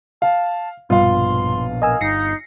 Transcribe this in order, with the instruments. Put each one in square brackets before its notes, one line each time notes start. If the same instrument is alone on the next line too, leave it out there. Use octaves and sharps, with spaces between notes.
[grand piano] F5 [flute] A5
[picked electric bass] A#1 B2 [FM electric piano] G2 [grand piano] F4 F5 [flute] C6
[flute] A#4 [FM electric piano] D#5 G#5 E6
[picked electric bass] G1 [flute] D#4 [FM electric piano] A#6 C7 C#7